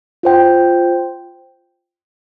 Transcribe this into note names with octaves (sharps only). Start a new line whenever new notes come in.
F4 C5 G5